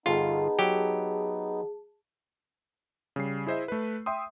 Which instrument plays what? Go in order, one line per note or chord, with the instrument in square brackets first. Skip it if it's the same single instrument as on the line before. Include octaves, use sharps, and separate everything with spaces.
[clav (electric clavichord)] G1 F4 [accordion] B3 D#4 [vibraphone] G#4 A5
[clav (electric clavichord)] F#3 G4 G5
[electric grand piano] C#3 G3 C7
E4 G#4 C5 D#5 E5
A3 B4
E5 G5 C6 D#6